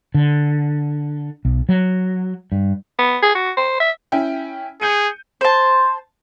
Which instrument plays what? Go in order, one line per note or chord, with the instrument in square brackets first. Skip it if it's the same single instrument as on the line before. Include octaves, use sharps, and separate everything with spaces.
[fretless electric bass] D3
B1
F#3
G2
[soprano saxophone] B3
G#4
F#4
C5
E5
[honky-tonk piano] C#4 E4 G5
[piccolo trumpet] G#4 [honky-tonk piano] G6 C#7 D#7
[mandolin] C5 A5